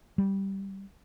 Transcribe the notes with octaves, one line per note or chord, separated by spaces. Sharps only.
G3